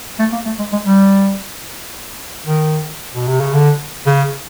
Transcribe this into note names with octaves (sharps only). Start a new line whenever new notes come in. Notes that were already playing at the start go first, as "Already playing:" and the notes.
A3
A#3
A3
G#3
G#3
G3
D#3
B2
C3
C#3
D3
C#3